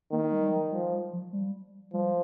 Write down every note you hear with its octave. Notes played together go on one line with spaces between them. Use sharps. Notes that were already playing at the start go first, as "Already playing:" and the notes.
D#3 A#3
G3
G3
F3
F3 G3
G3
F3
G3
F3 G3